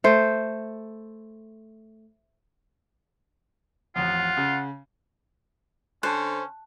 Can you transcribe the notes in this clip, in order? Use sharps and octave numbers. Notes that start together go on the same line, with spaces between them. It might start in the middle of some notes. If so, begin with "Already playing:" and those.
A3 C5
A1 F2 F4 F#5
C#3
D3 C#4 C5 A5 F#6